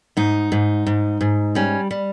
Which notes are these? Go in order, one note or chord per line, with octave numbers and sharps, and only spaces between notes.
G#2 D#4
G#2
G#2
G#2
G3 C#4
G3